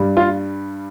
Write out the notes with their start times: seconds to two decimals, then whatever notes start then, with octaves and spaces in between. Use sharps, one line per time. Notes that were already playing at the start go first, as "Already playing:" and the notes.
Already playing: G2 G3
0.17 F4